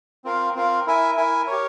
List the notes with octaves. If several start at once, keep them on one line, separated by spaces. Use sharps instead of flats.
C4 F4 A#4 F5
C4 F4 A#4 F5
E4 A#4 E5 G#5
E4 A#4 E5 G#5
G4 A#4 C#5